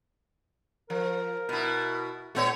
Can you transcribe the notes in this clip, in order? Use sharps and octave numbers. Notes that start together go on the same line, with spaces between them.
F3 A#4
B2 E4
A#2 A3 B3 C#5